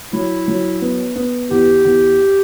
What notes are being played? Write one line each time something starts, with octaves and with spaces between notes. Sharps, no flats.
F#3 E4
F#3
B3
B3
E2 G4
E2